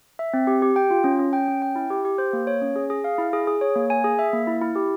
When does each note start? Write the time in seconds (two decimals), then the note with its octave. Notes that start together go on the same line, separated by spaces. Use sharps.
0.19 E5
0.34 C4
0.47 G4
0.62 G4
0.76 G5
0.91 F4
1.04 C#4
1.19 C#4
1.33 G5
1.48 C#4
1.62 G5
1.76 E4
1.90 G4
2.05 G4
2.18 C5
2.33 A#3
2.47 C#5
2.62 C#4
2.76 G#4
2.90 G#4
3.04 F5
3.18 E4
3.33 G#4
3.47 G#4
3.61 C#5
3.76 A#3
3.90 G#5
4.04 G#4
4.19 E5
4.33 A#3
4.47 E4
4.61 E4
4.76 G4